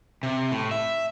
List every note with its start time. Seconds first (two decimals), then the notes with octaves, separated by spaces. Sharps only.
0.23 C3
0.51 A2
0.71 E5